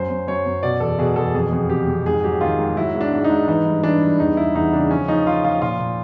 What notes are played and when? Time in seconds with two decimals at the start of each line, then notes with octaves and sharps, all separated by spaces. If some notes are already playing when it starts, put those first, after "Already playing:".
Already playing: F#2 C5
0.10 F#2
0.27 F#2 C#5
0.46 F#2
0.63 B2 D5
0.80 E2 A4
0.99 B2 G#4
1.16 E2 A4
1.35 F2 G#4
1.52 F2
1.70 C3 G4
1.88 F2
2.06 G#2 G#4
2.24 F#3 G4
2.41 D#3 F4
2.59 G#2
2.76 F#3 E4
2.95 G#2
3.01 D4
3.13 G#2
3.24 D#4
3.30 G#2
3.48 E3 D#4
3.65 G2
3.83 E3 D4
4.02 G2
4.20 E2 D#4
4.37 E2 E4
4.55 E2 D#4
4.73 C#3 D4
4.91 F3 C#4
5.08 F3 D#4
5.27 F3 F4
5.44 F3 F4
5.62 A#2 F4
5.79 A#2